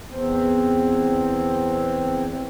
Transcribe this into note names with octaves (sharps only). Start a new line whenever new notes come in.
E2 C4